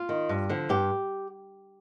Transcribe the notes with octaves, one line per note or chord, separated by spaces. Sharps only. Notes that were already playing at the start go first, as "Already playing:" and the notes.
Already playing: F4
D#3
G2
D3 F3
G2 G4